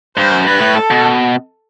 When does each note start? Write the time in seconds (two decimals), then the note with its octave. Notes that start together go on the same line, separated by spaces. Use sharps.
0.17 G2 C5
0.31 F#2
0.47 G2 B4
0.61 A2
0.76 A4
0.91 B2